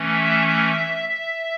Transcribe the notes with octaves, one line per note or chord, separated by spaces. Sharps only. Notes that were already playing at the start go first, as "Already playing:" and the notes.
Already playing: E3 A3 C#4
E5
E5